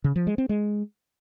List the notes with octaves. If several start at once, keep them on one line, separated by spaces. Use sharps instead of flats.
C#3
F3
G#3
C4
G#3